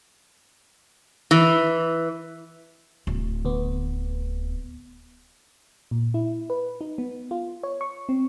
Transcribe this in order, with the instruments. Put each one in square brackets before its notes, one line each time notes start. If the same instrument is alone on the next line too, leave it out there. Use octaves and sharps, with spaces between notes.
[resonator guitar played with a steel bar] E3
[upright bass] D1
[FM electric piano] D2 B3
A#2
E4
B4
D#4
B3
F4
C#5
C#6
C4